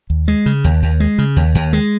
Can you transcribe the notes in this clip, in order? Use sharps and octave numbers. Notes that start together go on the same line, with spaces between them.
D#2
G#3
C#3
D#2
D#2
G#3
C#3
D#2
D#2
G#3